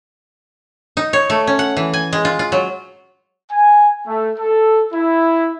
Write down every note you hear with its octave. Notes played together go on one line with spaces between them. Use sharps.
D#4
C#5
A3
C#4
F#5
E3
G#5
G#3
F4
F4
F#3
G#5
A3
A4
E4